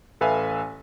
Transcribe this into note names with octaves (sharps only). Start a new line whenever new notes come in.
A1 A4 B4 E5 F5 G#5